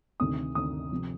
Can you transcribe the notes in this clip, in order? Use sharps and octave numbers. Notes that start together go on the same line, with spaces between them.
D2 C3 D#3 D#6
D2 C3 D#3 D#6
C3 F3